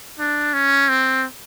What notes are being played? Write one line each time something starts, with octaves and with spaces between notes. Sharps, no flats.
D4
C#4
C4